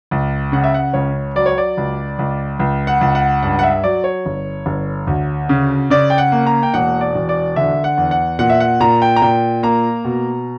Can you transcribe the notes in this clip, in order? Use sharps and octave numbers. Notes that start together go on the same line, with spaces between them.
C#2
C#3 F#5
E5
F#5
C#2 C#5
F#3 D5
C#5
D5
C#2
C#2
C#2
F#5
C#2
F#5
G2 F#5
F#5
E5
F#3 D5
C#5
G1
G1
D2
C#3
C#3 D5
G5
F#5
A#3
A#5
G5
E1 F#5
D5
E1
D5
D3 E5
F#5
E2
F#5
A#2 F#5
E5
F#5
A#2 A#5
G5
A#5
A#2 G5
A#3 A#5
B2